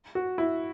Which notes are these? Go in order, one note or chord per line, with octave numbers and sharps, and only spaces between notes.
F#4
E4